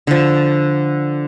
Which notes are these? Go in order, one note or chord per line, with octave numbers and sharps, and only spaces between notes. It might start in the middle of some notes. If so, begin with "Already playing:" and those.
D3 F3